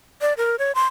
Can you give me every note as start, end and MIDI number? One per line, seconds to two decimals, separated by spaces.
0.21 0.33 74
0.37 0.56 70
0.59 0.72 73
0.75 0.85 84